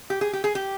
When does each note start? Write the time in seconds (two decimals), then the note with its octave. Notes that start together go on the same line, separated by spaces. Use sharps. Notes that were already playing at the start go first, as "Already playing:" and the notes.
0.10 G4
0.21 G#4
0.33 G4
0.44 G#4
0.55 G4